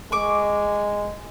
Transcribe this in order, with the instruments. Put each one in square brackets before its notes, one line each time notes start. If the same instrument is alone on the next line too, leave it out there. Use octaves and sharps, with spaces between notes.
[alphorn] G#3 [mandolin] C#6 D6